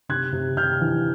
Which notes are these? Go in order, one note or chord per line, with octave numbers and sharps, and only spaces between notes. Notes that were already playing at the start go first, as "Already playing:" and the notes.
C3 F#6 G#6
C3
C3 F6 G6
E3